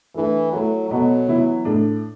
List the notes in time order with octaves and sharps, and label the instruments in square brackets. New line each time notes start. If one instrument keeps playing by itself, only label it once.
[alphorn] E3 [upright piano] A3 D4 A4
[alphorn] F#3 [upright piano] A3 E4 A4
[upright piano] B2 B3 F#4 A4 [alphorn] F#3
[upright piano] E3 B3 E4
A2 A3 D4